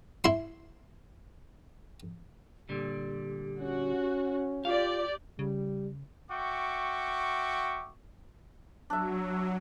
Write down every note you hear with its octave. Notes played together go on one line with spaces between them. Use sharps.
E4 C6
A#2 D3 G3 G4
C#4 F#4
F4 G4 D5 F5
C#3 G3
F#4 E5 G5 C#6 D6
F#3 D4 E5